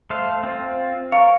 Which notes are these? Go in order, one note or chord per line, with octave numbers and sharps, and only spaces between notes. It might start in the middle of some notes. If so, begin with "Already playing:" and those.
A3 C5 F5
C4 F4
A#4 C#5 F5 C#6